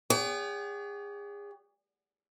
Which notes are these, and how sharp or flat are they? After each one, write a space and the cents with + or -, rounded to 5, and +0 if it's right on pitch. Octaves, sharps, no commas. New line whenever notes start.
G#4 -35 C#5 +45 F#5 +40